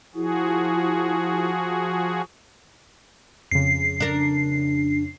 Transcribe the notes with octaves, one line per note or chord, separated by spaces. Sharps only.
F3 E4 F#4 G#4
F2 C#3 C7
D4 A#4